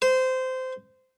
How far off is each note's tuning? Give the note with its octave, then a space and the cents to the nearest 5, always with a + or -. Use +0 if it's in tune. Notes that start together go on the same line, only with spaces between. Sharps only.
C5 -20